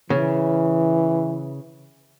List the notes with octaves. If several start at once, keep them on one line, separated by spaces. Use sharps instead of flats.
C#3 E3